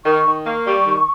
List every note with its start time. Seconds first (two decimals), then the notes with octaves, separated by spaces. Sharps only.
0.05 D#3 C#6
0.26 D#3
0.46 A#3 C#6
0.67 G3
0.87 D#3